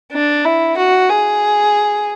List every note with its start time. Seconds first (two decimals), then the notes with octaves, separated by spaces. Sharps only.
0.12 D4
0.45 E4
0.77 F#4
1.09 G#4